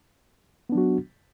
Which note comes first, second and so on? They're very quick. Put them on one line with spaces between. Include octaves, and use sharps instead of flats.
B3 D4 F#3 F#4